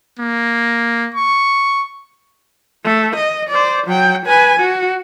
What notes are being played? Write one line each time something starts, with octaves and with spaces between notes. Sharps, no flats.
A#3
C#6
A3
D#5
C5 D5
F#3 G5
B4 G#5
F#4